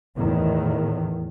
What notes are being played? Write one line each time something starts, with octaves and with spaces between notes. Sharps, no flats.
E2 A2 D#3